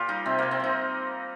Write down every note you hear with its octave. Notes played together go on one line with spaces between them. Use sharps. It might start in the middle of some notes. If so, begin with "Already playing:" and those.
Already playing: A#2 F4 G4
G3 D#4
C3 C4
C3 A#3
C4
C3 D#4